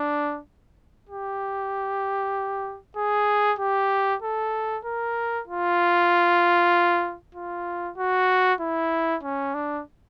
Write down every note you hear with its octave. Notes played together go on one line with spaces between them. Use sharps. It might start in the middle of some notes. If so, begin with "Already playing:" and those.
Already playing: D4
G4
G#4
G4
A4
A#4
F4
F4
F#4
E4
C#4
D4